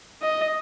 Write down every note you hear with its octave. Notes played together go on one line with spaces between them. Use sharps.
D#5